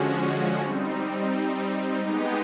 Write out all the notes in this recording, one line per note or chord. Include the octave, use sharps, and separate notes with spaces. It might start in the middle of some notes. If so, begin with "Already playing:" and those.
Already playing: D3 F3 G#3 C#4 F#4
G3 C4 D#4
G#3 B3 D#4 G4